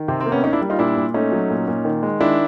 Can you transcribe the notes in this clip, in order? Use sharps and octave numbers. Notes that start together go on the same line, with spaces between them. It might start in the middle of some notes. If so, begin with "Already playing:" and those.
Already playing: D#3
C3 C4
C4
A#3
B3 C#4
A#3 C#4 D#4
D4 E4
G3
D#4 F4
A#2 D4 E4
A#2
A3 C#4 D#4
F#3
A#2
A#2
D#3
G#3
D#3 D4 E4